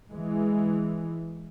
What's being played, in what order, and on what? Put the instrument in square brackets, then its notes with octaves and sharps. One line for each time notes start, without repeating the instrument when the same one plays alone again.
[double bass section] E3 G#3